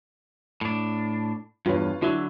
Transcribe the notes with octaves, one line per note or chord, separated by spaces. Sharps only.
A2 D4
E2 G2 F4 B4 C#5
D3 F#3 E4